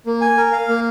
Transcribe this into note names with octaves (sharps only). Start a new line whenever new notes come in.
A#3
G#5
A#4
F5
A#3